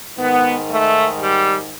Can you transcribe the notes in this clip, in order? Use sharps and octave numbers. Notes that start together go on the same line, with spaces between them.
G#2 D#3 B3
A3
G3